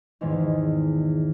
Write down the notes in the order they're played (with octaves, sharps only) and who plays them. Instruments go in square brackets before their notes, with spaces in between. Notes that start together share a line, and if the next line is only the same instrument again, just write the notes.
[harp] E2 G#2 B2 D#3 E3